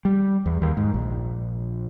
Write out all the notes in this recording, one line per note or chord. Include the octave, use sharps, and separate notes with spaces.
G3
E2
D#2
G#2
A#1